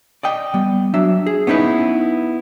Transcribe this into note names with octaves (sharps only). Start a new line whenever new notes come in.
D5 D#5 G5
G3 B3
F#3 D4 E5
G#4
B3 C#4 D#4 E4 B4